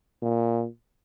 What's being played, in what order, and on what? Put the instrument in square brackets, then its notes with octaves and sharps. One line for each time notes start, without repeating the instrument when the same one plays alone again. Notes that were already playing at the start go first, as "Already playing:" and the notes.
[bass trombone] A#2